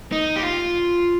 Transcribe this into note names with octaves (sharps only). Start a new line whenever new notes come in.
D#4
G4
F4